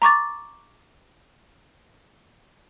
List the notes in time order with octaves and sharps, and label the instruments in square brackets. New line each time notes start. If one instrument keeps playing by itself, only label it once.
[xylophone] A#5 C#6 D6 A6